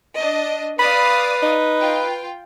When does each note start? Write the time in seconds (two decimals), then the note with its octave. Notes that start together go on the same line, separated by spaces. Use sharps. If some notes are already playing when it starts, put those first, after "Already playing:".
0.16 D4 D#5
0.79 B4 D5 F5 B5 D#6
1.43 D#4
1.79 F4 G5